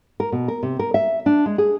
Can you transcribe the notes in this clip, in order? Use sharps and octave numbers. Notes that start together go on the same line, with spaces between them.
A#4
B2
A#4
C3
A#4
E5
D4
G#3
G#4